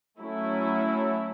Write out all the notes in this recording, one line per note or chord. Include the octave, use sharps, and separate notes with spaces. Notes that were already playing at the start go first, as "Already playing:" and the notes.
F#3 A3 C#4 E4